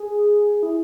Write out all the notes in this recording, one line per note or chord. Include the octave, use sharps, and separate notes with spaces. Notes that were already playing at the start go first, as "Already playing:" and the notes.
Already playing: G#4
E4